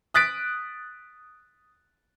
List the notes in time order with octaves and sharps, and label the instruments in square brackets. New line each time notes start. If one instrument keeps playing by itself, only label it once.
[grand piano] D#6 F#6 A6 B6 D7